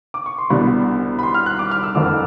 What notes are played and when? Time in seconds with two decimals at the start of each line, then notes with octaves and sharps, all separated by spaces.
0.14 D6
0.26 C#6
0.38 C6
0.50 C2 B2 G3 B3 D4 B5
1.19 B5
1.23 C6
1.34 F6
1.46 F#6
1.59 D6
1.71 F6
1.83 E6
1.95 F#1 F2 D3 D6